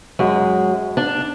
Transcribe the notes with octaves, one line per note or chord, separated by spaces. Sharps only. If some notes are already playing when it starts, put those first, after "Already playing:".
F#2 G#3
D4